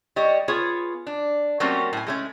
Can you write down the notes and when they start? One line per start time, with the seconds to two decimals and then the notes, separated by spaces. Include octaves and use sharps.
0.16 G3 C#5 D#5
0.48 B3 F4 G#4 C#5
1.07 D4
1.60 F#3 G3 A3 A#3 C4 C#4
1.93 A2 G#5
2.07 G#3 A3 C#4